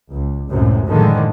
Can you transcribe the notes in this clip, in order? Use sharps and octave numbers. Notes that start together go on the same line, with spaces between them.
C#2
C#2 F#2 A2 C3
A2 D3 D#3 F3 G#3